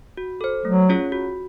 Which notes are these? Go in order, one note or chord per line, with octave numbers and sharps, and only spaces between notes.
F#4
A4 C5
F#3 A3
C#4 F4 G#4 C#5
F#4